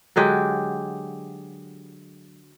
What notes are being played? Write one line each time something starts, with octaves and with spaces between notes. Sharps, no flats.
D3 F#3 G#3 G4